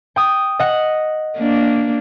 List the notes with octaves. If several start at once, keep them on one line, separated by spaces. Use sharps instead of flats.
G5 D#6
D#5 F#5
A#3 D4